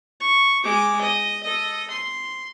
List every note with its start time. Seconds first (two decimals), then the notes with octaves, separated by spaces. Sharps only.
0.21 C#6
0.64 G#3 D6
1.01 D#5
1.43 A4 D#5
1.90 C6